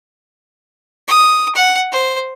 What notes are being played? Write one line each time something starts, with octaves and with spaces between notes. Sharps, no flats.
D#6
F#5
C5